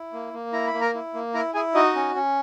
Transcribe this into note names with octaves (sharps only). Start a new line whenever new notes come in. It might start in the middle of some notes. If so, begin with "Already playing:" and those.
Already playing: E4
A#3
A#3
E4 A#5
B5
A#3
A#4 A#5
E4
A#3
E4 A#4 A#5
E4 G#4 G#5
D#4 F#4 D#5
C#4
C#4